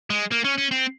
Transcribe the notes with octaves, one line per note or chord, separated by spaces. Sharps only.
G#3
A#3
C#4
C#4
C4